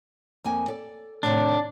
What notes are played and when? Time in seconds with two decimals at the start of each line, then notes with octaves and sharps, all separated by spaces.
0.44 F2 A#3 G#5
0.68 A4 D5
1.23 A2 C3 D#3 D4